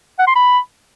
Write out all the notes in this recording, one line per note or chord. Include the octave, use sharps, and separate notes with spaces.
F#5
C6
B5